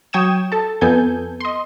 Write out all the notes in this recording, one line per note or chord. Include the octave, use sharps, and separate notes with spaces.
F#3 G5 C#6 D#6 G#6 E7
A4 A5
F2 B3 A4 G#5 G6
D#5 C6